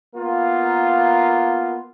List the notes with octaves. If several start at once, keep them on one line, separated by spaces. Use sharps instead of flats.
A#3 B3 F4 A#4